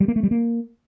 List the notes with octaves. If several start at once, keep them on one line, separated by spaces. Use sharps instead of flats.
G3
A#3
A3
G3
A#3